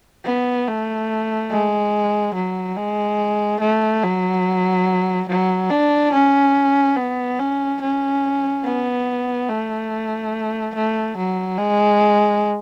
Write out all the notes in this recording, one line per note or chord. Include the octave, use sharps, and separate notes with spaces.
B3
A3
G#3
F#3
G#3
A3
F#3
F#3
D4
C#4
B3
C#4
C#4
B3
A3
A3
F#3
G#3